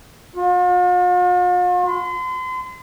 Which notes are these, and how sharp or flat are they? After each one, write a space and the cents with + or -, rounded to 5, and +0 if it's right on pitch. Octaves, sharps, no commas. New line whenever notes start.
F4 +45
C6 -40